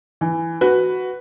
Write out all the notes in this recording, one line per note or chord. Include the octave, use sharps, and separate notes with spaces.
E3
F#4 B4